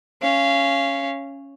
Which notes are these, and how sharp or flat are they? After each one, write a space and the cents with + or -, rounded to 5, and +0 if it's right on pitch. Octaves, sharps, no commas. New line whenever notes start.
C#4 +0 F5 -25